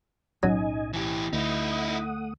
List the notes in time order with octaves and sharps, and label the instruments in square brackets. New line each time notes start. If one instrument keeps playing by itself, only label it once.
[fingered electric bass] B1 A2 C#4 [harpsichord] F#3 [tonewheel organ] D#4 D#5 G#5
[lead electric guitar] E3 G4 [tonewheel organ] G#5
[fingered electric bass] D2 [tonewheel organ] A3 F#5 D#6 [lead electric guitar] D#4 E4